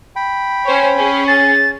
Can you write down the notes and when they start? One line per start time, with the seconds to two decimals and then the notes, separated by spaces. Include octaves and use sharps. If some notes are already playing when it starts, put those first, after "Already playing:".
0.16 G5 B5
0.65 C#4 C5 C#5
0.97 C#4 G#4
1.28 A6